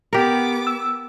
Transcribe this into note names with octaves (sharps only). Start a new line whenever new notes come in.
B3 G4 A#4 D6
E6